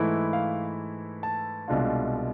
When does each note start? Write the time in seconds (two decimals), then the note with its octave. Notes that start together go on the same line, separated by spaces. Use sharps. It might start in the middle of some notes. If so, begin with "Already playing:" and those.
Already playing: G#2 E3 A3 E4
0.33 F5
1.23 A5
1.68 C2 B2 G#3 D4 F4